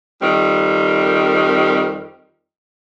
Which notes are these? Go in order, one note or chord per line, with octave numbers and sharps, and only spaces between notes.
F2 D#3 G3 C4